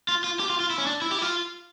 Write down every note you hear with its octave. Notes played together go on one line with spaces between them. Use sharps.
F4
F4
G4
F4
F4
E4
C#4
D4
E4
G4
E4
F4